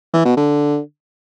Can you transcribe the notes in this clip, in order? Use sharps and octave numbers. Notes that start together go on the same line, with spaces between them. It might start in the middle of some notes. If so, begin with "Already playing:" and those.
E3
B2
D3